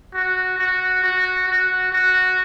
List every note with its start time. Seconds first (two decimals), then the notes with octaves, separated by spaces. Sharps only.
0.14 F#4
0.58 F#4
1.04 F#4
1.48 F#4
1.92 F#4